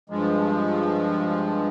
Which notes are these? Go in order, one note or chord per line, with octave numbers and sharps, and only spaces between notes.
G2 F3 G#3